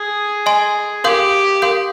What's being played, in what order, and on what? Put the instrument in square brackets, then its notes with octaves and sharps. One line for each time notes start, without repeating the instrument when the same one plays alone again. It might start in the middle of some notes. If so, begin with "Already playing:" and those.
Already playing: [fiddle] G#4
[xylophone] D#5 G#5 C6
[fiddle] G4 [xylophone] A#4 F5 C6 D#6 G6
[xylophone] A#4 F5 C6 D#6 G6